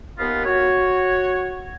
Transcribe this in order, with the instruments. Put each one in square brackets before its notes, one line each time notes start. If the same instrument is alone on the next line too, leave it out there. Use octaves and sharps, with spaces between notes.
[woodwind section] D#2 B3 F4
F#4 C#5